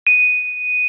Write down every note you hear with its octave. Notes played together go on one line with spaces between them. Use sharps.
D#7